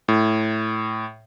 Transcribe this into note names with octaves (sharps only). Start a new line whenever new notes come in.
A2